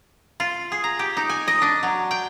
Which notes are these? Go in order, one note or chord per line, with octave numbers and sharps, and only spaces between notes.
F4
G#4
A#5
G4
D#4
G#5
D#5
D4
F#3
G5